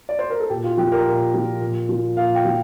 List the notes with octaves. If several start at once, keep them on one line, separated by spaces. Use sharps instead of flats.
D5
C5
A#4
A4
A#2 G4
F4
F3 G4
A#4
A#2
F3
A#2
F3
A#2 F5
G5
F3